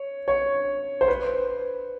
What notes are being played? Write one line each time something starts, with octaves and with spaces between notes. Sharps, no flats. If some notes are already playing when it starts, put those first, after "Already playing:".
Already playing: C#5
C#5
C5
B4